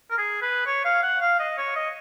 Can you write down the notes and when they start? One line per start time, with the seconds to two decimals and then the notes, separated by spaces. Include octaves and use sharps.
0.11 A#4
0.18 G#4
0.42 B4
0.66 C#5
0.85 F5
1.03 F#5
1.21 F5
1.39 D#5
1.57 C#5
1.76 D#5